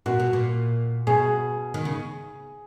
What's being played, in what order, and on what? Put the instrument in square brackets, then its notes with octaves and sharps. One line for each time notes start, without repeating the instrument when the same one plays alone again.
[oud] A#2 [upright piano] F#4
[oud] B2
A#2
[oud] B2 [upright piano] G#4
[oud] D#3
C#3